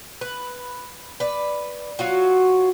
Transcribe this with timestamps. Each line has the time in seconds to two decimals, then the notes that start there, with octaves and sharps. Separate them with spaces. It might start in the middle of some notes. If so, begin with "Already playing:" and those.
0.21 B4
1.20 B4 D5
1.99 F#3 F4 F#4